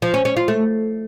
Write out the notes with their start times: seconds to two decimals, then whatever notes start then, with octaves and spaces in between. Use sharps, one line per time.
0.02 F3
0.14 C#4
0.25 C#4
0.37 F4
0.48 A3